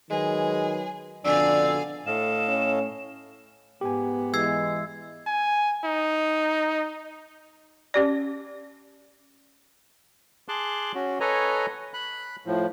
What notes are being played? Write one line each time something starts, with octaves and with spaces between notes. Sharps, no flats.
D#3 F#3 G#3 G#4 B4
F2 B2 D3 D4 G#4 D5 F5 E6
A2 A4 D#5 F5 E7
C#4
G#2 B3 G4 G#5
E3 G#3 E6 G#6 C7
G#5
D#4
C#4 G4 D5
G#4 A5 C6 D6 F#6
C#4 F#4
A4 B4 C#5 D#5 G#5 A#5
B5 F#6
A2 F3